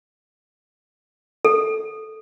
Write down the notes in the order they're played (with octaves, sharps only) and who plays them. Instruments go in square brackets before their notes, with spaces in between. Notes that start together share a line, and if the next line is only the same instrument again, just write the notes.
[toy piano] A4